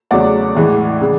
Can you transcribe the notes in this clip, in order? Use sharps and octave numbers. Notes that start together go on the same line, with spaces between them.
E2 C#3 F#3 A3 D5 F#5
A2 E3 G#3
C#3 G#3